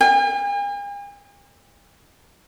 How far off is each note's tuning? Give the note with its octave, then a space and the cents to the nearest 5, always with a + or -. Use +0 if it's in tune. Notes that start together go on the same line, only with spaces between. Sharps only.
G#5 -45